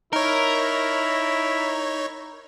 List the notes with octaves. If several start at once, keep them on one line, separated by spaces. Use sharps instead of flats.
D#4 E4 A#4 C#5